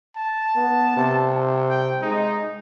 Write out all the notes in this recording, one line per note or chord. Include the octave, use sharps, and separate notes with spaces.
A5
B3
C3
G5
G#3 D#4